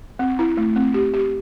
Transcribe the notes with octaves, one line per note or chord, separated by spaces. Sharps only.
C4
E4
A3
C4
G4
G4